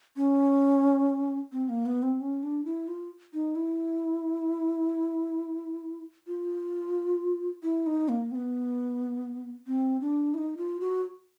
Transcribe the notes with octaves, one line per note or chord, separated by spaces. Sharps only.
C#4
C4
A#3
B3
C4
C#4
D4
E4
F4
D#4
E4
F4
E4
D#4
A#3
C4
B3
C4
D4
E4
D#4
F4
F#4